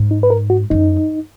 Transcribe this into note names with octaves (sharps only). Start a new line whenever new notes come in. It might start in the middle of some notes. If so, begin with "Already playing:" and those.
Already playing: G#2
D#4
B4
A#4
F#4
F#2 D#4